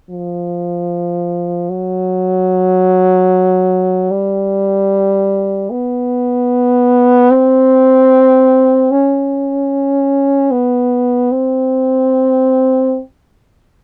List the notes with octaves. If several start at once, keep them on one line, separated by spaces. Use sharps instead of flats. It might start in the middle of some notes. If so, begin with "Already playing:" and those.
F3
F#3
G3
B3
C4
C#4
B3
C4